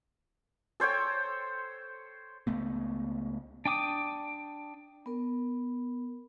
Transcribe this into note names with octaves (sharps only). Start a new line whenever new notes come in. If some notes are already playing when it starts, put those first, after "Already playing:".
A4 C5 C#5 G5
C#2 A3 B3
D4 G5 D6 D#6
B3 A#4